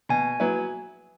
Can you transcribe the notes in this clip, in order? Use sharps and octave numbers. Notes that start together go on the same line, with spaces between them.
B2 G#5
F#3 B3 E4